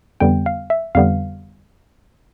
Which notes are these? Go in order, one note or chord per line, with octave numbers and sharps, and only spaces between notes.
F2 D3 G3 B3 G5
F5
E5
F2 D3 G3 B3 F5